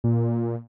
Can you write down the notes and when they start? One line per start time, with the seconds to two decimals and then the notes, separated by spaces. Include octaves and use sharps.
0.04 A#2